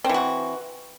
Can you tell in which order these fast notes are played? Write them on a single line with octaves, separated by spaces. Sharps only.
C4 E3 F#4